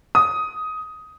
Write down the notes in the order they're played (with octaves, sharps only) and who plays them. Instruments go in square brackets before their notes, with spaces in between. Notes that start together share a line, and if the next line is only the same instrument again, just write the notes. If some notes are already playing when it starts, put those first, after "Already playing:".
[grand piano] D#6